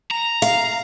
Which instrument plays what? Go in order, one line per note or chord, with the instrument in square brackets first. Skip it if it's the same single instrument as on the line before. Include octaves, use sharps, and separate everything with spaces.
[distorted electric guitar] A#5
[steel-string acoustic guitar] F5